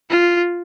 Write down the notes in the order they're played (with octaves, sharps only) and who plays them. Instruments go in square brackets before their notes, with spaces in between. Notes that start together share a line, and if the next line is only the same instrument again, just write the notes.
[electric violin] F4